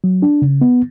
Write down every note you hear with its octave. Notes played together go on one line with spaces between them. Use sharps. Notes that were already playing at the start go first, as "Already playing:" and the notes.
F#3
D4
C#3
B3